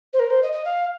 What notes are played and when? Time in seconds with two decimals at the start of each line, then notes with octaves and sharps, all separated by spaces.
0.13 C5
0.19 A#4
0.30 C5
0.42 D#5
0.52 D#5
0.65 F5